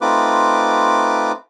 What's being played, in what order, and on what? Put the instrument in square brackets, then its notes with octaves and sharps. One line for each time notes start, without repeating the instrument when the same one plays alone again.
[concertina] A3 C4 D#4 F4 B4 D6